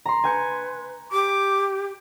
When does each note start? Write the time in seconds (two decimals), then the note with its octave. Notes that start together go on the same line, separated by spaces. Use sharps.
0.06 A#5 C6
0.24 B4 G#5 G6 C#7
1.12 G4 D6